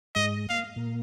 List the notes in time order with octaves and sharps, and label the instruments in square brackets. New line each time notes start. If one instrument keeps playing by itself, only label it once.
[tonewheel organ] G#2 G#3 [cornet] D#5
[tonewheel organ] A#3 [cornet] F5
[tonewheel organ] A#2 A#3